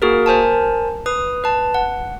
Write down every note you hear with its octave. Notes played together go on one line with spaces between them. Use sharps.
A#3 F#4 G#4 A#4
A#4 C5 G#5 A5
B4 D#6
B4 A5
F#5